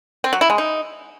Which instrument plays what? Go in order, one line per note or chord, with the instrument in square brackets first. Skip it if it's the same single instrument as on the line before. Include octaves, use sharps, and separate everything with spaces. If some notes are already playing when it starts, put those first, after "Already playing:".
[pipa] C4
F#3
E4
G#3
D#4